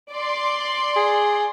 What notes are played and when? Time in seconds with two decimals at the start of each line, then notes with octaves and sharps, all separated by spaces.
0.11 D5 C6
0.96 G#4